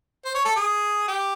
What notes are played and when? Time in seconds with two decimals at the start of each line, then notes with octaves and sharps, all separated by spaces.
0.25 C5
0.34 C#5
0.45 A4
0.56 G#4
1.08 G4